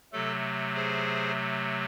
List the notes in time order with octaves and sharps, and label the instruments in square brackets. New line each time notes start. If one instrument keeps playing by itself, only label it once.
[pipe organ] C3 F#3 A3 A4
G#4 C5